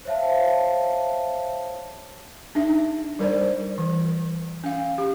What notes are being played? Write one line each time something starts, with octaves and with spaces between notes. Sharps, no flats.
C5 C#5 E5 F5 A5
D4 D#4 E5
G3 A#4 C5 D5
E3
C#4 F5
G4